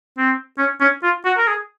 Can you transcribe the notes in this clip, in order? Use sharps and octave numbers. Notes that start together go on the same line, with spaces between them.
C4
C#4
C#4
F4
F#4
A#4
G#4